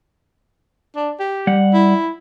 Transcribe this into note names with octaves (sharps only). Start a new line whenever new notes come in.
D4
G4
G3 F#5
E4